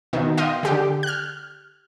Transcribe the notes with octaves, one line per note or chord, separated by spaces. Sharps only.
B2 D#3
D#5 F5 G5 C6 D#6
D3 G4
F6 F#6